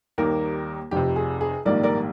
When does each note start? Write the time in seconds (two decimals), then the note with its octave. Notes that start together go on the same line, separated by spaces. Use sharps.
0.18 D#2 D#3 G3 A#3 G4 A#4
0.91 F1 F2 C3 G4
1.16 G#4
1.41 G#4
1.65 A#1 G#2 D#3 G3 A#3 A#4 D5
1.83 A#4 D5